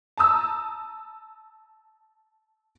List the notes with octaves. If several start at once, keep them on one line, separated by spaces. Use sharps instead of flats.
A5 A#5 D#6 E6